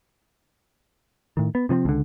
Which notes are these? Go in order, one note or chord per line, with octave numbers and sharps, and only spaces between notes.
A2 D#3
B3
C3 F3 A#3 C4
C#2 D3